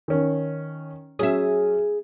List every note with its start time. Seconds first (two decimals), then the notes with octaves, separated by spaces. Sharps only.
0.08 D#3 C#4
1.19 F#3 C#4 G#4 E5